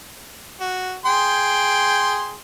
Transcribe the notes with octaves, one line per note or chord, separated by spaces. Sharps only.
F#4
G#4 G5 C6